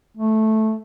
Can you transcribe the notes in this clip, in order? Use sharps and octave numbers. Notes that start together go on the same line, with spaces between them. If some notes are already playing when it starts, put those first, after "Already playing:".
A3